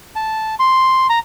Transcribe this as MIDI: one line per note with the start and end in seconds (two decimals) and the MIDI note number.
0.16 0.55 81
0.59 1.07 84
1.09 1.19 82